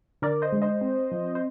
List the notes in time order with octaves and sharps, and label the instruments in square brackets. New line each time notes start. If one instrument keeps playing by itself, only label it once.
[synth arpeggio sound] D3 A#4 D5
C5 D#5
G#3
C5 D#5
C4
F3
C5